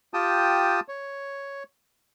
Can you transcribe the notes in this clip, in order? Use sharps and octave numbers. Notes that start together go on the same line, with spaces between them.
F4 G4 G5 A5 D#6
C#5